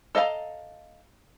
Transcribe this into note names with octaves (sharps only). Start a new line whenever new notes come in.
A4 D#5 F5 G#5 A#5